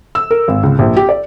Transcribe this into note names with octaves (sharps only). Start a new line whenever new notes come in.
E6
A#4
G#1
C#2
A#1
G4
D5